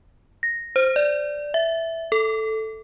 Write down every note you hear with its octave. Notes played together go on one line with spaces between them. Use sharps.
A#6
C5
D5
E5
A4